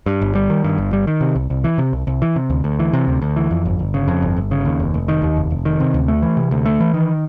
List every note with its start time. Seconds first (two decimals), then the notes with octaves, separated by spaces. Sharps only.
0.06 G2
0.22 G1
0.35 G3
0.50 D#3
0.64 G2
0.78 G1
0.93 G3
1.07 D#3
1.21 C3
1.35 C2
1.50 C2
1.64 E3
1.78 C3
1.93 C2
2.07 C2
2.22 E3
2.36 C3
2.50 D2
2.64 D2
2.79 E3
2.93 C3
3.08 D2
3.22 D2
3.36 E3
3.51 F2
3.65 G1
3.79 G1
3.94 C#3
4.08 F2
4.22 G1
4.36 G1
4.51 C#3
4.65 D#2
4.80 F1
4.94 F1
5.08 D#3
5.22 D#2
5.37 F1
5.50 F1
5.65 D#3
5.80 C3
5.94 D2
6.08 A3
6.22 E3
6.37 C3
6.51 D2
6.66 A3
6.80 E3
6.94 D#3